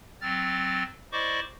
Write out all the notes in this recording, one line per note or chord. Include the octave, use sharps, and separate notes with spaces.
F#3 C4 F6 A6
E4 C5 D5 D#5 C#6 D6